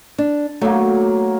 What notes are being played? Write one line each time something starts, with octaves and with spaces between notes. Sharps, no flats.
D4
F#3 A3 A#3